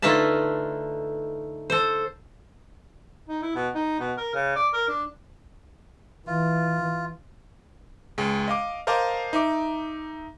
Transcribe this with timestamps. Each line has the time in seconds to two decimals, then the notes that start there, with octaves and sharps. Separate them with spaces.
0.02 D3 A3 D#4 F4 B4 A5
1.70 A4 C5
3.29 D#4
3.42 E4
3.55 B2
3.75 D#4
3.99 B2
4.17 A#4
4.34 C#3
4.55 D5
4.73 A#4
4.88 D4
6.27 E3 F4
8.18 C#2 G#3
8.48 D#5 F5 D6
8.87 A#4 C5 D#5 F5 A5 D6
9.33 D#4 E5 D6